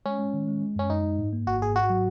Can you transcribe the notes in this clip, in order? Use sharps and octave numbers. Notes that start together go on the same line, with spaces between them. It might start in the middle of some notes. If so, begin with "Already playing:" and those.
G#3 C#4
G#3
D#3
G#3
G#3
F#2 C#4
F#2 D#4
F#2
G#2
A#3
G#1 F#4
G#2 G#4
G#2 F#4
F#3